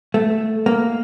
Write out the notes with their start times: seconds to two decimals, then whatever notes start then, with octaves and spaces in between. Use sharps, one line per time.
0.14 A3
0.66 A#3